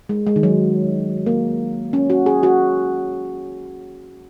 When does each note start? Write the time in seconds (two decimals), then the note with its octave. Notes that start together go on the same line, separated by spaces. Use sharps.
0.09 G#3
0.27 G#3
0.36 D#3
0.43 F#3
1.26 A#3
1.93 C#4
2.10 F#4
2.26 G#4
2.43 F#4